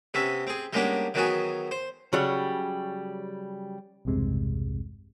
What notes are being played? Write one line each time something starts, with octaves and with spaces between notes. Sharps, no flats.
C3 B3 C#4 E5
C4 G#4
G3 G#3 A#3 B3 C#4 D4
D#3 E3 F#3 B3 F#4 G#4
C5
C#3 F#3 G3
B1 E2 G2 C3 G#3